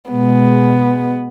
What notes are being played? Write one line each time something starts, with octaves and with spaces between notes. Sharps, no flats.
B2 G#3 B3